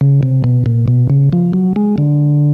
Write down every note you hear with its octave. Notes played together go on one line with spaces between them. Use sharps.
C#3
C3
B2
A#2
B2
C#3
F3
F#3
G#3
D3